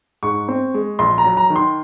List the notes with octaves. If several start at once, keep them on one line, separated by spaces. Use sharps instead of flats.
G#2 C#6
C4
G#3
A#1 C6
A#5
F#3
A#5
D#3
C6